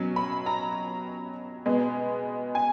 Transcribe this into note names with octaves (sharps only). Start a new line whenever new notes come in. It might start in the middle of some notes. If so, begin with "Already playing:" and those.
Already playing: B2 F#3 C#4
B5
A#5
B2 G#3 B3
G#5